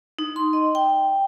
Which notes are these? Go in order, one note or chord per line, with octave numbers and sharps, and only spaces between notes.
D#4
C6
D#5
G5